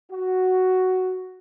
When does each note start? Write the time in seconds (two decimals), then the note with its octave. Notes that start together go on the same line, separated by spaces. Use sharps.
0.12 F#4